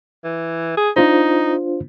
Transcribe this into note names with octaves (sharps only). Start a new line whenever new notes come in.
E3
G#4
D4 D#4 F4 C5